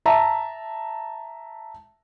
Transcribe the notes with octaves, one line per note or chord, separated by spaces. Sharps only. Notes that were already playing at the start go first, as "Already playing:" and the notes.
E5 A5 A#5